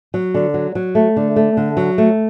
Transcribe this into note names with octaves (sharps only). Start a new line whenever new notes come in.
F#3
D3
F#3
F#3
A3
D3
A3
D3
F#3
A3